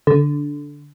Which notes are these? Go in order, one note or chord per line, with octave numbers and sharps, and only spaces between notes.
D3